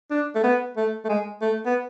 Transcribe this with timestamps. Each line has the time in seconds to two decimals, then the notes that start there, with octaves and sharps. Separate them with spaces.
0.11 D4
0.35 A3
0.43 B3
0.76 A3
1.05 A3
1.09 G#3
1.41 A3
1.65 B3